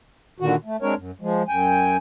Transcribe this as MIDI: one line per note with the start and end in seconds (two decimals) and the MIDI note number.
0.40 0.56 46
0.40 0.56 50
0.40 0.56 51
0.40 0.56 66
0.65 0.77 57
0.82 0.95 56
0.82 0.95 60
0.82 0.95 62
0.82 0.95 70
0.82 0.95 73
0.96 1.11 42
1.21 1.43 53
1.21 1.43 56
1.48 1.97 42
1.48 1.97 79
1.48 1.97 80